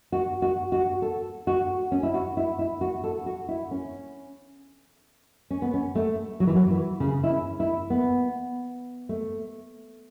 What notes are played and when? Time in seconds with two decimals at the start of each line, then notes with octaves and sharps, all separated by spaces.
0.12 F#4
0.42 F#4
0.72 F#4
1.02 A4
1.47 F#4
1.92 C#4
2.03 E4
2.14 F#4
2.37 E4
2.59 E4
2.81 F#4
3.04 A4
3.26 F#4
3.49 E4
3.71 C#4
5.50 C#4
5.62 B3
5.74 C#4
5.95 A3
6.40 F#3
6.47 E3
6.55 F#3
6.70 E3
7.00 C#3
7.24 E4
7.30 C#4
7.60 E4
7.90 B3
9.09 A3